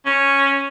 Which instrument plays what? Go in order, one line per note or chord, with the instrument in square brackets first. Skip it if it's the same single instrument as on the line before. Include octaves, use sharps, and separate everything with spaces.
[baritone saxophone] C#4